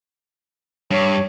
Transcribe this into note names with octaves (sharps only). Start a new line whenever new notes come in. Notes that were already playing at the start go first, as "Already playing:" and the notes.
G2 C#5